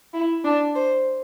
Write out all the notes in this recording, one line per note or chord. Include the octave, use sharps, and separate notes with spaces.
E4
D4
C5